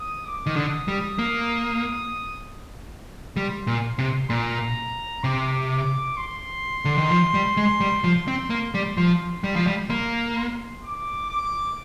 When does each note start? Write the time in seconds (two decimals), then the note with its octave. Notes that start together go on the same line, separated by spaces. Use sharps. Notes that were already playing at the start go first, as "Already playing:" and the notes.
Already playing: D#6
0.26 D6
0.46 D#3
0.56 D3 D#6
0.88 G3
1.19 A#3
3.36 G3 C6
3.67 A#2
3.98 C3
4.29 A#2 A#5
5.23 C3 D6
5.70 D6
6.17 C6
6.85 D3
6.98 D#3
7.10 F3
7.34 G3
7.57 G#3
7.80 G3
8.04 F3
8.28 C4
8.50 A#3
8.74 G3
8.97 F3 C6
9.44 G3
9.56 F3
9.67 G3
9.90 A#3 A#5
10.37 C6
10.84 D6
11.30 D6